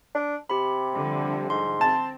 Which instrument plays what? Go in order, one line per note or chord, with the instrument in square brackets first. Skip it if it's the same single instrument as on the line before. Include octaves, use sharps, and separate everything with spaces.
[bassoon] D4
[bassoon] C3 [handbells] G4 B5
[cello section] D3 F3 G3
[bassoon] G#2 [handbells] C6
[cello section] C4 [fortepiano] A5